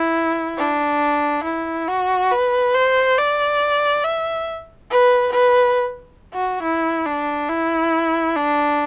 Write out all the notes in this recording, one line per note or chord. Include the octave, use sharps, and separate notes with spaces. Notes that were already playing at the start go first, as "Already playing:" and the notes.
Already playing: E4
D4
E4
F#4
B4
C5
D5
E5
B4
B4
F#4
E4
D4
E4
D4